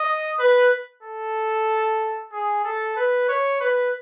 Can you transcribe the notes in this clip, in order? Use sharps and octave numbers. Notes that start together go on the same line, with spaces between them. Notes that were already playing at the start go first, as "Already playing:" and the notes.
Already playing: D#5
B4
A4
G#4
A4
B4
C#5
B4